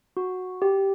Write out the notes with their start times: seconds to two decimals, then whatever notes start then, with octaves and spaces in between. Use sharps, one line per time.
0.17 F#4
0.62 G4